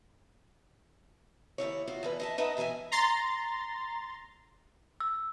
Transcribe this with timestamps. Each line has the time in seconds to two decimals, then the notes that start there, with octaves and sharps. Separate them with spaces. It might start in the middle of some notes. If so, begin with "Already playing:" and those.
1.58 D#2 A#2 E4 C#5
1.88 F4 F#4
2.03 E2 B2 B4
2.20 D#5 E5 A5
2.38 D#4 B4 D#5 E5 F#5 A5
2.57 B2 E3 A#4 E5 G#5
2.92 A#5 C6 A6
5.00 E6